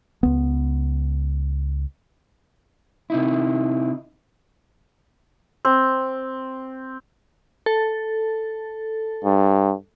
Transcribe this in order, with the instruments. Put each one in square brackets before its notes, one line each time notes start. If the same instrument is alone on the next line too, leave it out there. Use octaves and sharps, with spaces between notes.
[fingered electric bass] C#2 B3
[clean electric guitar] C3 D#4 E4
[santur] C4
[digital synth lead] A4
[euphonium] G2